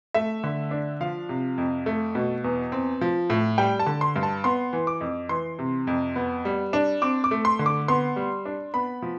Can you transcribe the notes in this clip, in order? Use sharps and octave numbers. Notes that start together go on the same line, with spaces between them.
A3 E5
D3
D4
F3 F5
C3
F2
A3
B2
E2
C4
F3
A2
G3 G5
A5
D3
C6
G2
A5
B3 C6
E3
D6
F2
E3 C6
C3
F2
B3
G3
D4
C4 D6
D6
A3
C6
D3
D6
B3 C6
G3
D4
B3 B5
F3